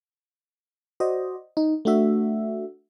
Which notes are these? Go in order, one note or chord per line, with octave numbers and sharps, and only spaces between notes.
F#4 C5 D5 D#5
D#4
A3 D4 F#4 E5